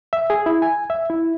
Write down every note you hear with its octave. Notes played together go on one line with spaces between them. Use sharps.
E5
G#4
E4
G#5
E5
E4